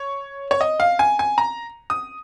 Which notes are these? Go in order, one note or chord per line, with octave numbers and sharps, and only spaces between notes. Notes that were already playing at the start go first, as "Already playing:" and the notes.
Already playing: C#5
C#5
D#5
F5
G#5
G#5
A#5
D#6